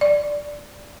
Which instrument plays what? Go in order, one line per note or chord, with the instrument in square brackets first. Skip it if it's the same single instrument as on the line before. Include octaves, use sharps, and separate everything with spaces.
[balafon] D5